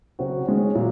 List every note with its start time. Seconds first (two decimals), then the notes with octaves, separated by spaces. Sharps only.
0.19 C#3 F#3 C4 F#4
0.47 D#3 G#3 C#4
0.75 A#2 F#3